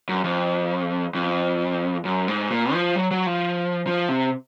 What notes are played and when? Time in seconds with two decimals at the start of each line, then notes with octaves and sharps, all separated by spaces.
0.09 F#2
0.24 F2
1.15 F2
2.05 F#2
2.28 G#2
2.51 A#2
2.73 F3
2.96 F#3
3.11 F#3
3.26 F3
3.87 F3
4.09 C3